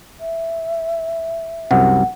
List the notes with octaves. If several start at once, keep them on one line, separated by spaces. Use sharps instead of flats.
E5
C2 F#2 C3 F#5